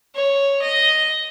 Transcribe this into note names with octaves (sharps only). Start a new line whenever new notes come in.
C#5
D#5